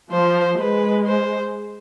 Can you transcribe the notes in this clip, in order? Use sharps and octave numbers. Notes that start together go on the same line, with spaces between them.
F3 C5
G#3 B4
C5